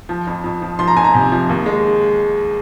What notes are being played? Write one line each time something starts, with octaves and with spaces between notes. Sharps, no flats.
F3
F2
F2
F3
F3 C6
A#5
F2 G#5
A#5
C3
F3
D#2
G#3